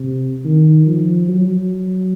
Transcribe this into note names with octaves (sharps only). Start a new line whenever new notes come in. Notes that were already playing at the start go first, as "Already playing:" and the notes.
Already playing: C3
D#3
F3
F#3